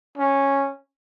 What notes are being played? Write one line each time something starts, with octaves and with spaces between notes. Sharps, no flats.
C#4